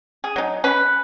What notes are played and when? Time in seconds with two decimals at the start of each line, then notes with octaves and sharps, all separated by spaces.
0.24 G#4
0.36 F#3 D#4
0.64 C#4 B4